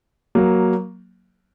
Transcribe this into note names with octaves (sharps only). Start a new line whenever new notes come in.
F#3 A#3